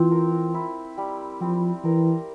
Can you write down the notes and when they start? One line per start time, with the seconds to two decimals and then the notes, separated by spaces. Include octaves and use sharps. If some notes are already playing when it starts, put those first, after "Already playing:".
Already playing: E3 F3 C4 F4
0.11 A#4
0.54 E4
0.98 G3
1.41 F3 C4
1.85 E3 A#4